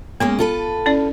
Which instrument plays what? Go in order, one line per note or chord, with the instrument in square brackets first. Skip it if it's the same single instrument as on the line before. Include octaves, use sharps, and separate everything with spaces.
[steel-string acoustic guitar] G#3 A#3 C#4 [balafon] B3
[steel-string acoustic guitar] F4 A4 B4
[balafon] C#4 E4 D5